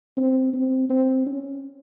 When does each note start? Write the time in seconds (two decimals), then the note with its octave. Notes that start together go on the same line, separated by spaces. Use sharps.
0.17 C4
0.53 C4
0.90 C4
1.26 C#4